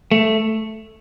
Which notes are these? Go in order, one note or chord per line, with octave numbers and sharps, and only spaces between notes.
A3